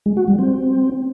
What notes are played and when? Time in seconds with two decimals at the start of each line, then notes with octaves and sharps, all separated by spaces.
0.06 G#3
0.17 F#4
0.28 G3
0.39 C4